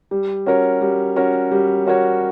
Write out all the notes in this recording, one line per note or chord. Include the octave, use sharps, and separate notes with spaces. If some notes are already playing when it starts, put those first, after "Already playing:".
G3
C#4 F#4 A#4 C#5
G3
C#4 F#4 A#4 C#5
G3
C#4 F#4 A#4 C#5